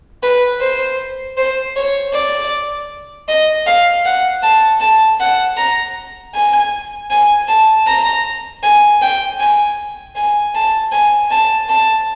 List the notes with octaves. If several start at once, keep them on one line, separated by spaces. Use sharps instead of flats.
B4
C5
C5
C#5
D5
D#5
F5
F#5
A5
A5
F#5
A#5
G#5
G#5
A5
A#5
G#5
G5
G#5
G#5
A5
G#5
A5
A5